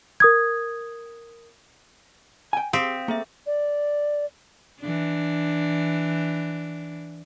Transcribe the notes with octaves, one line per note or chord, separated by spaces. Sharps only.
A#4 D#6 G#6
G5 G#5
C4 G4 F5 D#6 B6
A#3 G#4 A4 E5
D5
E3 D4